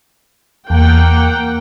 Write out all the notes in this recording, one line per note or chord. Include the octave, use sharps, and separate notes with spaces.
E2 A#3 F#5 G5